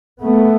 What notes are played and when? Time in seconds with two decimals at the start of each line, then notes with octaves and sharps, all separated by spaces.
0.23 A3 B3